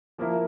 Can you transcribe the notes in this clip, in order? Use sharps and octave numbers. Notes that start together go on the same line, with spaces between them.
F3 A#3 E4 A#4